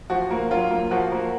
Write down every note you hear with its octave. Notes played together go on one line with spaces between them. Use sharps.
F3 F#4
A#3
F#3 F4
A#3
F3 F#4
A#3